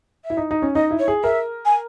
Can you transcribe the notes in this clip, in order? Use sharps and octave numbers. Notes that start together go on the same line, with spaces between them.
E5
E4
D#4
D#4
C#4
D#4 D#5
E4
C#5
G#4
A#4 E5
G#5